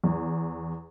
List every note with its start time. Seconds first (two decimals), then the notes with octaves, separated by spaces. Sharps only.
0.04 E2